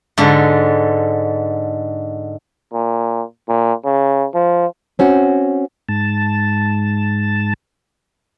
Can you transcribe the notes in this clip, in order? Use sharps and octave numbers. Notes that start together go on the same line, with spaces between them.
G#2 D3
A#2
A#2
C#3
F3
C4 C#4 F#4
G#2 A5